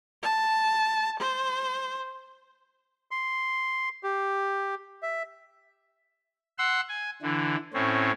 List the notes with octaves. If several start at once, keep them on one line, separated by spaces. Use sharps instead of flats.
A5
C5
C6
G4
E5
F#5 C6 E6
G#5
D3 E3
A2 C4 C#4